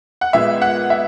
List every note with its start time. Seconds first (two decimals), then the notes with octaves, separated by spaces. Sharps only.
0.21 F#5
0.33 A#2 G#3 B3 E5
0.62 F#5
0.90 E5